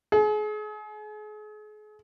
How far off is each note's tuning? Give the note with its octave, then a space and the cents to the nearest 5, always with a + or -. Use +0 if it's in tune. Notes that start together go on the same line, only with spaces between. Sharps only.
G#4 +35